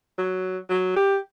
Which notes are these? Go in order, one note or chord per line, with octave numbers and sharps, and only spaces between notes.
F#3
F#3
G4